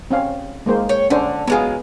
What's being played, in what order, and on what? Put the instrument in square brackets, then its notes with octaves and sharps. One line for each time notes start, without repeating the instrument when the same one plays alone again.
[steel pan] C4 C#4 F5
G#3 A#3 C5
[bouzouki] C#5 G5
[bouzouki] D3 [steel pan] C#4 D4 C5
[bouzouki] F#3 G#3 F4 [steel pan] B3 G#4